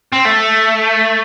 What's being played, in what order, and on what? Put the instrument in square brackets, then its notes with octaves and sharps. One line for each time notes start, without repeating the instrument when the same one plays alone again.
[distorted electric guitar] C4
A3